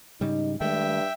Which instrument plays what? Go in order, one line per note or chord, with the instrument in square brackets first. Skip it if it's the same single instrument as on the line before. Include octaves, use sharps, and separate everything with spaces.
[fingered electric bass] G#2 C#3 G3 [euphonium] D#4
[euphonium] G2 [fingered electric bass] D#3 G#3 A3 [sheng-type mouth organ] E5 G5